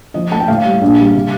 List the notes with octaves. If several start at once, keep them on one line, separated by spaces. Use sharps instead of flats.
F3 D#5
A3 A5
G5
A2 F5
G3
A#1
G3
C3